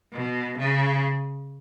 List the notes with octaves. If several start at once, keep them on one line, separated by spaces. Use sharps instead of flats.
B2
C#3